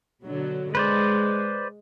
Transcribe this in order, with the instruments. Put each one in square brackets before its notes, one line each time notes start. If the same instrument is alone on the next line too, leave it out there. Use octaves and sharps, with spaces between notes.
[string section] B2 D3 F#3
[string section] G#3 [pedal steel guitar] B4 C5 D5